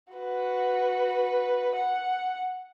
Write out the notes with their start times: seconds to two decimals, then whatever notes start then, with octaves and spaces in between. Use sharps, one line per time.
0.13 F#4 B4
1.76 F#5